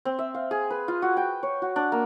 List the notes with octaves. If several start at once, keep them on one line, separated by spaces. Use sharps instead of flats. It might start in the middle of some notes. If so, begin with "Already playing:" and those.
C4
E5
F5
G#4
B4
F4
F#4
G5
C#5
F#4
D4
A#3